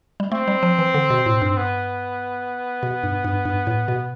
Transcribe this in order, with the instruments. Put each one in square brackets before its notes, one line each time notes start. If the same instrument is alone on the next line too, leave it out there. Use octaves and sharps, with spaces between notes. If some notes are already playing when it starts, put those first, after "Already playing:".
[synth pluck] G3
[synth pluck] A3 [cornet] C4
[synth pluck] G3
F3
E3
D3
B2
A2
G2
[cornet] B3
[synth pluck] B2
G2
G2
G2
A2
B2